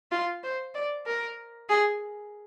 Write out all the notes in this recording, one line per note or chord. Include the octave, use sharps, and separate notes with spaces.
F4
C5
D5
A#4
G#4